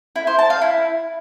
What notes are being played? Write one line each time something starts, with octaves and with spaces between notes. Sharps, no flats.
E4
C5
A5
F5
E4